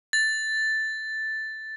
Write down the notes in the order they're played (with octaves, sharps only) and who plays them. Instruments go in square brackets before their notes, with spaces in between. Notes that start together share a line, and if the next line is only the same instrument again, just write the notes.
[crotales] A6